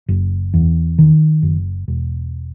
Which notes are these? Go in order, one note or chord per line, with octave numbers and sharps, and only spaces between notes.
F#1
E2
D#3
F#1
E1